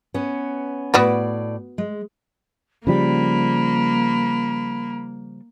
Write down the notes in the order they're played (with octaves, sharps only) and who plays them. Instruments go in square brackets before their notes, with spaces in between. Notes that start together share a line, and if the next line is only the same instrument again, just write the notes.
[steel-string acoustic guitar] B3 C#4
[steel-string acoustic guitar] A2 D5 [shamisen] B3 F#4 B4
[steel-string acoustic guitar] G#3
[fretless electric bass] C#3 F3 G3 [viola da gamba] A#3 [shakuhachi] B5